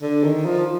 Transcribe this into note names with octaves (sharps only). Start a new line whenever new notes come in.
D3
D#3
F3